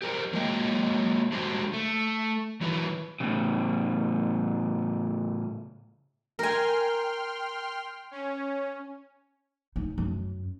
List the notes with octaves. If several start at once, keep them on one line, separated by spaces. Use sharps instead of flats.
G4 A#4 C5
F#3 G#3 A#3 D#5 F5 G5
G#3 D4 F#4 G4 C5
A3
D#3 E3 F#3 E4 B4
A2 C#3
A#4 G5 G#5 C6 F6
C#4
D#4
F#2